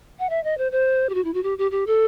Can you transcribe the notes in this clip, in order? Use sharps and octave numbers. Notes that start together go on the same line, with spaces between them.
F#5
E5
D#5
C5
C5
G4
F#4
E4
F#4
G4
G4
G4
A4